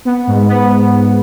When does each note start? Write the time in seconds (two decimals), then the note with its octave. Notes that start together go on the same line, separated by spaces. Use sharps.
0.05 B3
0.27 G#2
0.49 B3